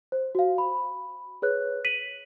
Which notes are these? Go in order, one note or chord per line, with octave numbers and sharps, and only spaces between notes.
C5
F#4 F5
B5
G#4 B4 C#5 F#6
B6 D#7 F#7